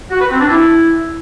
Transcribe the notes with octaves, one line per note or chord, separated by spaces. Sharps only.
F#4
B4
C4
D4
E4